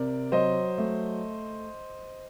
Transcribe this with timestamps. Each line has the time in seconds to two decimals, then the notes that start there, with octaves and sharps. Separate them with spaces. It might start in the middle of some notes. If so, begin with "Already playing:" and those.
Already playing: C3 A#4 D5
0.32 F#3 C5 D#5
0.78 A3